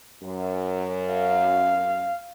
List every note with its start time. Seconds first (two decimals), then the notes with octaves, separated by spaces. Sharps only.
0.23 F#2
1.13 F5